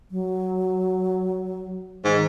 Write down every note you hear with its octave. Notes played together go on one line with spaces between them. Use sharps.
F#3
G#2 D#3